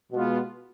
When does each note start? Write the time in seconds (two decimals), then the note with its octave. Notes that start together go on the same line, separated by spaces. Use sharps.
0.12 B2 G#3 B3 F4